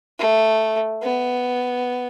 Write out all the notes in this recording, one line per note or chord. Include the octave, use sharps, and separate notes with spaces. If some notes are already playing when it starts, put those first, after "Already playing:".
A3
B3